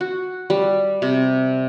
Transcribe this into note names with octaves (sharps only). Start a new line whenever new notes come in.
F#4
G3
C3